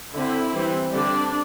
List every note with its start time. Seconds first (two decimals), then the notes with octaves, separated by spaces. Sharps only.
0.14 D3 C4 E4
0.54 E3 G3 C4
0.93 D3 G3 C4 D4